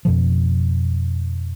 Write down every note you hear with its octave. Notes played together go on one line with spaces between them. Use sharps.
F2 B2 F3